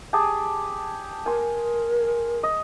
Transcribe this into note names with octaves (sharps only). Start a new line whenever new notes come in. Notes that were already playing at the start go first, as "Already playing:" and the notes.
G4 G#4 A5
A#4 G#5 C6
D#5